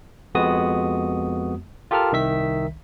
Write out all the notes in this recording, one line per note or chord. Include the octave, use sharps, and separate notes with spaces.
F2 G#3 B3 F#4 D#6
F4 G4 A4 A#4 A5 F6
C2 D#3 E5 B6